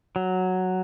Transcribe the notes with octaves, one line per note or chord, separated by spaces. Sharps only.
F#3